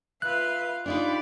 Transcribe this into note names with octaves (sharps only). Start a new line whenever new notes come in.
F4 B4 E5 F5 F#6
D4 D#4 F4 G4 D5 B5